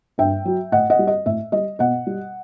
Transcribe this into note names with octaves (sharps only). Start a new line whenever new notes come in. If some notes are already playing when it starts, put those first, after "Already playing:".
G2 E5 G5
F#3
A2 D#5 F#5
D#5 F#5
G3
D#5
A2 E5
G3 D#5
B2 D#5 F#5
G3